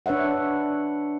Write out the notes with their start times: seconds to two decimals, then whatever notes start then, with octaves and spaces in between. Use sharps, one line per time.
0.06 D4 B4 C#5 E5 F#5